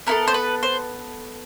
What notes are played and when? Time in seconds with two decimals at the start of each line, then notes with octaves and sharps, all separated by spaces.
0.07 B3 E4 A4 A#4
0.28 C5
0.34 B4
0.63 C5